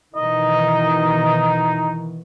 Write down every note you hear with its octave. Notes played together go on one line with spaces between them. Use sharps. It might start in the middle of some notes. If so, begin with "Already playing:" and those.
B2 D#3 E3 D#4 D#5